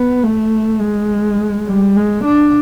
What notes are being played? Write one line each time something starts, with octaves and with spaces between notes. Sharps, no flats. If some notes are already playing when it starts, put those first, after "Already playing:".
Already playing: B3
A3
G#3
G3
G#3
D4